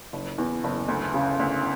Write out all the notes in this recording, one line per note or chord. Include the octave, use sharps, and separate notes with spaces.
F#1
E2
F#1
D2
C#3
D2